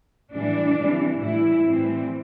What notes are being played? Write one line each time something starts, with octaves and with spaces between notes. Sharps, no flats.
A2 E3 G3 D4
C3 E3 G3
A2 E3 G3 E4
A2 E3 G3 C4